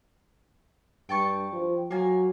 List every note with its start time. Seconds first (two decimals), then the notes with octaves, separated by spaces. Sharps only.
1.09 G2 G5 A5 C#6
1.53 F3
1.91 F#3 A#3 G#5